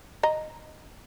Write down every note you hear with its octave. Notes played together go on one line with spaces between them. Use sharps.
D#5 A#5